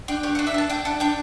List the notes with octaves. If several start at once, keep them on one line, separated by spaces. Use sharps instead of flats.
D4 G5
G4 C#5
F#5
D4
E5
D4 A5
D4 G5
D4 F#5
D4 G5